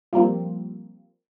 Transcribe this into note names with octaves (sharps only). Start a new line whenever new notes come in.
F3 G3 A#3 C4